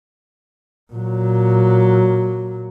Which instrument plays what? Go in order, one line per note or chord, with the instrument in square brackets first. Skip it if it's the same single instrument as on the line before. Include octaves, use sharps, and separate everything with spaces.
[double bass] A#2 F#3